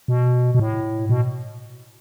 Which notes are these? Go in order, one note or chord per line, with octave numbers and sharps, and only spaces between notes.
B2
B2
A2
B2